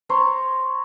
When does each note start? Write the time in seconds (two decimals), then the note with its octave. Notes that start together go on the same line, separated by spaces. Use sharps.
0.09 C5 C#5 A#5 C6